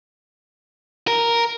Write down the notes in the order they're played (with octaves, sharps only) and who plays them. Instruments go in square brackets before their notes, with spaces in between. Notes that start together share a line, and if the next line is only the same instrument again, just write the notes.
[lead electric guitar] A#4